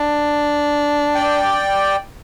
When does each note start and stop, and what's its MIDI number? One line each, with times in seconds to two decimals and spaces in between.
0.01 1.64 62
1.15 1.96 74
1.15 1.96 79